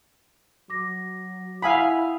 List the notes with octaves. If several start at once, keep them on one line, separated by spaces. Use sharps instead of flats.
F#3 D6 A#6
E4 F5 F#5 G#5 B5 D#6 E6